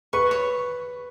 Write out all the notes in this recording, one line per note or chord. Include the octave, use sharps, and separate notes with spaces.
B4 C#6
C#5